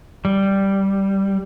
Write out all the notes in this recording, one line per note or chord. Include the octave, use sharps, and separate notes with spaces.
G3